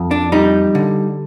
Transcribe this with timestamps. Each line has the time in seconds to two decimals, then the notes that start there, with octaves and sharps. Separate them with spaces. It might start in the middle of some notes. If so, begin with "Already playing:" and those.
Already playing: F2
0.11 D4
0.32 G3 D#4
0.75 D3